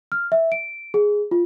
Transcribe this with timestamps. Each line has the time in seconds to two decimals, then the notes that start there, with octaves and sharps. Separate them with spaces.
0.12 F6
0.32 E5
0.52 D7
0.94 G#4
1.31 F4